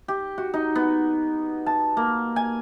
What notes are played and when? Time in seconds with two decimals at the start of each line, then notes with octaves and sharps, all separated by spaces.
0.08 G4
0.38 F#4
0.54 D#4
0.76 B3
1.66 A5
1.97 A#3
2.36 G#5